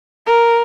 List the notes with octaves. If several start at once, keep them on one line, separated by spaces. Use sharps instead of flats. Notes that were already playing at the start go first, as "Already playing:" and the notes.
A#4